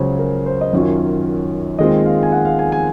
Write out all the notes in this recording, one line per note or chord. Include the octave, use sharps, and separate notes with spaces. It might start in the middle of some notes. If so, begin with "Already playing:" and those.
Already playing: C#2 C#3 F#3 C#4 C5
A#4
C5
D#5
F#2 D#3 F#3 C#4 F4 C#5
D#2 D#3 G#3 C4 F4 D#5
F5
G#5
F#5
F5
G#5
G#5